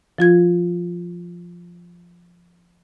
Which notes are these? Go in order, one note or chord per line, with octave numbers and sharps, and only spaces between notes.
F3 F4 G#6